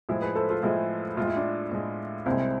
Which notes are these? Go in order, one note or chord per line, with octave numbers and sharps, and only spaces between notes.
A2 F3 G#3 E4 G#4
G#4 B4
A4 C5
F4 A4
A2 F3 G#3 E4 G#4
A2 G#3 F4
E4
D4 F4
A2 G#3
C2 C3 G#3 C4 E4